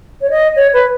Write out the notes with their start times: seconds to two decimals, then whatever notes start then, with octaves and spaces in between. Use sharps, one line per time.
0.21 C#5
0.30 D#5
0.56 C#5
0.73 B4